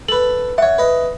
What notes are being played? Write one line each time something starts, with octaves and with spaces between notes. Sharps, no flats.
A4 B4 F#7
C#5 E5 F#5
B4 D#5